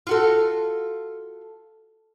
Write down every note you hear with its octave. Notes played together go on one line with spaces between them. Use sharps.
F4 F#4 A4